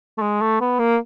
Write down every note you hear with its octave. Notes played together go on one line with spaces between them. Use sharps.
A3
G#3
A3
B3
A#3